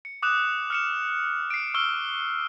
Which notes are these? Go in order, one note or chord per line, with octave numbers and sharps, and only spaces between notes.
C#7
D6 D#6 F#6 E7
F6 C#7 E7
C7 D7
C#6 E6 F6 G7